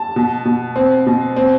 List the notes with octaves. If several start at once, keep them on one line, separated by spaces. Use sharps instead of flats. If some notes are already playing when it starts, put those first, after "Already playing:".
Already playing: A5
B2
B2
C4
B2
C4